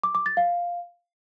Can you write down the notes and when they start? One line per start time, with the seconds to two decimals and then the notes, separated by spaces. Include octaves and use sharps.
0.03 D6
0.15 D6
0.26 A6
0.37 F5